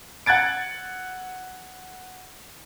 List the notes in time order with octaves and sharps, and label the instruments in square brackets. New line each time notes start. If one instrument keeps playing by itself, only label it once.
[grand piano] F#5 F#6 G#6 A6 D7